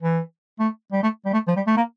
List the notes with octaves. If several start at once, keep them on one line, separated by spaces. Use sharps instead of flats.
E3
A3
G3
A3
G3
A3
F3
G3
A3
A#3